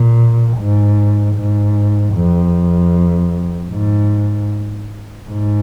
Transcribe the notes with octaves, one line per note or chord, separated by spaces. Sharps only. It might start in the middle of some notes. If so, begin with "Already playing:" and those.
Already playing: A#2
G#2
G#2
F2
G#2
G#2